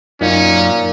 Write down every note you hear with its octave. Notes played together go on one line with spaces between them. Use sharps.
F#2 A#2 C#4 D#4